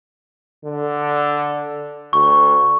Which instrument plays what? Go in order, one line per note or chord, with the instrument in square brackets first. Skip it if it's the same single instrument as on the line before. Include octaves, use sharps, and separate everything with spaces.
[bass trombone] D3
[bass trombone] D2 [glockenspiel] C#6